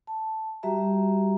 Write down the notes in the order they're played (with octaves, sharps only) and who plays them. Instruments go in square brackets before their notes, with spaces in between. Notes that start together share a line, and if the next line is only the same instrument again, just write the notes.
[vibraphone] A5
G3 F#4 G4 E5 A#5